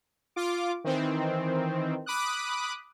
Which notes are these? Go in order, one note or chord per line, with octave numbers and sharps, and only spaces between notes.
F4 D6
D#3 E3 C4
B5 D6 D#6 F#6